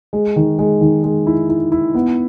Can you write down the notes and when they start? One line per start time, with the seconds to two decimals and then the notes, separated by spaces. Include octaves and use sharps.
0.13 G#3
0.36 D#3
0.59 G#3
0.81 D#3
1.04 G#3
1.27 E4
1.49 E4
1.72 E4
1.94 B3